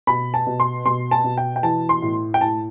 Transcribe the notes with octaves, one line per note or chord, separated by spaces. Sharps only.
B2 B5
A5
B2
C6
B2 C6
A5
B2
G5
G5
E3 A5
C6
A2
G5
A2 A5